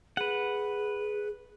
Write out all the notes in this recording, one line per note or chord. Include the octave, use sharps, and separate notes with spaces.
G#4 B4 F#5